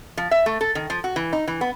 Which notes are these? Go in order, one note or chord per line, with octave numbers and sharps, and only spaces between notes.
F3
E5
A3
A4
D#3
F3
F#4
E3
D#4
E3
B3